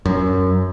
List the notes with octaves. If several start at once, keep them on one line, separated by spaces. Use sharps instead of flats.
F#2